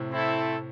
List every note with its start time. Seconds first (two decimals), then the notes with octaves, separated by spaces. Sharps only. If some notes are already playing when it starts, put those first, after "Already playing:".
Already playing: A2 C3
0.11 A3 C4 E4 A4